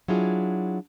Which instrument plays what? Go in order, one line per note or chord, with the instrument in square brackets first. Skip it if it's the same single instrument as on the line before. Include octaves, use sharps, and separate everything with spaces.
[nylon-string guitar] F#3 D4 E4 F4 G#4